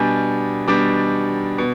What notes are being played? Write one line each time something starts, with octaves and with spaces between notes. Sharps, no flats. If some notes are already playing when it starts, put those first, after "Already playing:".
Already playing: B2 G3 D4 G#5
B2 G3 D4 D6
B2